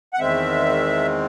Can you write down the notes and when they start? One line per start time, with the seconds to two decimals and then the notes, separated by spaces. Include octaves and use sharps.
0.14 F#5
0.19 E2 D#3 G#3 C4 E5